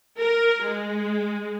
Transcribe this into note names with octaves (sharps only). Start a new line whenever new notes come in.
A#4
G#3